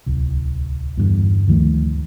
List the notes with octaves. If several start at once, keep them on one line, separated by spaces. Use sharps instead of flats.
D1 C2
E2 G2 D3
D2 D#3 F3 A3